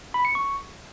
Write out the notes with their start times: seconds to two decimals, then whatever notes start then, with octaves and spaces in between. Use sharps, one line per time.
0.14 B5
0.25 C#7
0.35 C#6